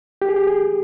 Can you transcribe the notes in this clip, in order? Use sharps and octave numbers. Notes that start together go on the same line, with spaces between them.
G4
G#4
G4
G#4